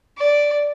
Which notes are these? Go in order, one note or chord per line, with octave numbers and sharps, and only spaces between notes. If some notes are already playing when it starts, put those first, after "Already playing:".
D5